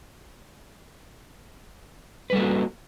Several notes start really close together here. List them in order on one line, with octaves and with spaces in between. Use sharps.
B4 G3 A4 A#3 F#4